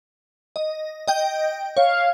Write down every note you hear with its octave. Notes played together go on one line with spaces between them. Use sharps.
D#5
D#5 G5 G6
C#5 F5